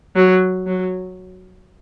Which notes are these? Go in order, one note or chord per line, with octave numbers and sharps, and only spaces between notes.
F#3
F#3